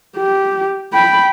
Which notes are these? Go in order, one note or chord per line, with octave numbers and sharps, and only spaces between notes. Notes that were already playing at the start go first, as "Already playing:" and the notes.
G4
G5 B5